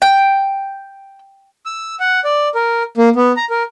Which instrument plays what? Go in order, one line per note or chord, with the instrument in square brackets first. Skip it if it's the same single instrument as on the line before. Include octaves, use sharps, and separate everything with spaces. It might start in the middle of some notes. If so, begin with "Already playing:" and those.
[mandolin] G5
[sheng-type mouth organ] E6
F#5
D5
A#4
A#3
B3
A#5
A#4